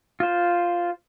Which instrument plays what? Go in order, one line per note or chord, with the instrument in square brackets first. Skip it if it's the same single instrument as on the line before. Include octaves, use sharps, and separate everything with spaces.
[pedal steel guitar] F4 C5